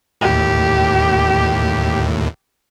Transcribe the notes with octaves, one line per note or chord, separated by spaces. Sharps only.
D#2 A2 G4